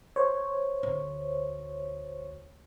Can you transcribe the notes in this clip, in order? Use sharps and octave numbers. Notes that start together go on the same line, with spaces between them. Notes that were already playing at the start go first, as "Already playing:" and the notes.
C5 C#5
D2